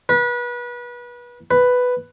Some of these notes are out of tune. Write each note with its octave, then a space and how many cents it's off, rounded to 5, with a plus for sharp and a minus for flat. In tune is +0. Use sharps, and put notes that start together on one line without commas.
B4 -30
B4 +5